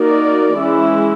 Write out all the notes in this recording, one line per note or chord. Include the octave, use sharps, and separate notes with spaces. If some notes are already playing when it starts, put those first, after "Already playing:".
Already playing: A#3 D#4 F#4 A#4 D5
E3 G#3 C#4 E4